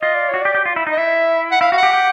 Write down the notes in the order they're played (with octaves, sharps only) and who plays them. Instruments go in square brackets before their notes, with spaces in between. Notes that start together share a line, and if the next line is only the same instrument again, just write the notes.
[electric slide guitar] F4 [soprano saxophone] D#5
[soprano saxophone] D5
C#5
[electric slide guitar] F#4
[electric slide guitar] G4 [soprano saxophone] D5
[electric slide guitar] G4
F4
E4
D#4
[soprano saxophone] D#5
[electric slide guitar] E4 [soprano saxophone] E5
[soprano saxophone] F#5
[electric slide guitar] E4 [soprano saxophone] F5
[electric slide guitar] F#4 [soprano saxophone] F5
[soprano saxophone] F#5
[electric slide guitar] G4
G4